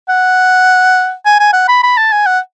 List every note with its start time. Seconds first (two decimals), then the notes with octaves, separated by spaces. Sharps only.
0.09 F#5
1.25 G#5
1.40 G#5
1.53 F#5
1.68 B5
1.84 B5
1.97 A5
2.12 G#5
2.26 F#5